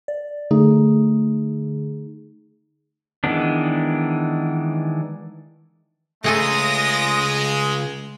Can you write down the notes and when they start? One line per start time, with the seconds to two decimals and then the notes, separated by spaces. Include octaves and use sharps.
0.08 D5
0.51 D3 A3 D#4 G#4
3.24 D#3 E3 G#3 B3 D4
6.24 C#2 G#3 A3 G#4 A4 D#6 A#6